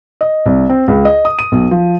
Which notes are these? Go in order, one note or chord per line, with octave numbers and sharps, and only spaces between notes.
D#5
C2
C4
C#2
D#5
D#6
D#7
B1
F3